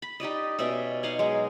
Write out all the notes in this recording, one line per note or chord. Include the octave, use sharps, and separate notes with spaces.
B5
D#4 G4 D5 D#5
B2 C#4 D5 E5
D#4 F5 F#5 G#5
F#3 G#3